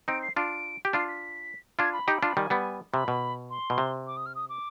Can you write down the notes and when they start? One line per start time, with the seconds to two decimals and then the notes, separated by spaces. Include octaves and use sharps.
0.08 C4 D#4 D7
0.22 C7
0.36 D4 F4 D7
0.85 G4
0.93 D4 F4 C7
1.08 B6
1.79 D4 F4 G#6
1.93 B5
2.08 D#4 G4
2.23 D4 F4 B5
2.36 D#3 G3 G#5
2.50 G3 B3
2.93 C3 B5
3.08 B2
3.50 C6
3.70 B2
3.78 C3
4.07 D6
4.17 D#6
4.26 F6
4.35 D#6
4.49 D6